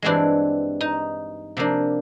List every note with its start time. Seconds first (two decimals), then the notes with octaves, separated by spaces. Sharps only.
0.02 G2 E3 G#3 C4 D4
0.81 D#4
1.57 C3 F3 A#3 D4